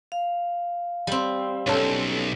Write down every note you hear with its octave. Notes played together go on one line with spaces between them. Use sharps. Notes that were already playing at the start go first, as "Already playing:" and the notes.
F5
G3 C4
B1 C#4 A4